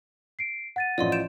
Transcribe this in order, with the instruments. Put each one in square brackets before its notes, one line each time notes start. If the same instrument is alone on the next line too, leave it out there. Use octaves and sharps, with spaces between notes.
[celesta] C7 D7
F#5 A6 D#7
[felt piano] A1 F3 [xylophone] D5 D#5 C6
[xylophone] G6 D7 E7